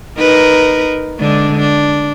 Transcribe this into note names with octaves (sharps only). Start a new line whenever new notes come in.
D#4 A#4 B4
D3 G#3 D4
D4